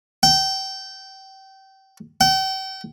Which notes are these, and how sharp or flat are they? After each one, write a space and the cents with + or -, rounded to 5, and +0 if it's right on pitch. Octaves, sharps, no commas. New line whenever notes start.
G5 -25
G5 -40